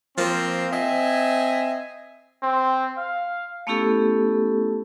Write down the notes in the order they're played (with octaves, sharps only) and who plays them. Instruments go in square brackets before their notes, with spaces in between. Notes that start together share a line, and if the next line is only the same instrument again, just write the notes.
[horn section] F3 A#3 C4
C4 D#5 E5 G#5
[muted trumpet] C4
F5
[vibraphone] A3 B3 C#4 E4 G4 A4